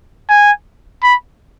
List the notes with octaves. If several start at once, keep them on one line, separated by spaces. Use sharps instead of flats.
G#5
B5